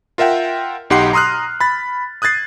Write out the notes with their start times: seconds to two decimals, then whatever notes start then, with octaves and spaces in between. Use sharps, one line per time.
0.18 F4 A#4 E5 F#5 G5
0.90 B1 D#4 G4 F#5 C6 C7
1.13 A#5 C6 D#6 F6 F#6
1.60 B5 A6
2.22 D#6 F#6 G#6 A6 C7